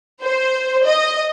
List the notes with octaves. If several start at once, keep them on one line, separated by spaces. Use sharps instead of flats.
C5
D#5